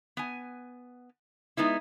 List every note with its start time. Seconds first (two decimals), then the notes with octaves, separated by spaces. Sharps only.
0.17 B3 G#5
1.57 G#3 B3 D#4 E4